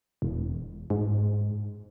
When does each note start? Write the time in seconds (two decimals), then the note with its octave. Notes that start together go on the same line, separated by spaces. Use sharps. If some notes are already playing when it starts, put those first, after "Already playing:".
0.22 E1
0.90 G#2